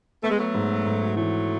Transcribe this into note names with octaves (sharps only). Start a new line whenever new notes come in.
A3 B3
G#3
F#3 A3
G#2
G#2
E3 F#3 A3